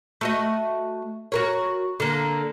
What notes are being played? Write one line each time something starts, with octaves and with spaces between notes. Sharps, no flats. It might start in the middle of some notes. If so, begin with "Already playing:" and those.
A3 F#4 D#5
F#4 A#4 C#5
D3 A#3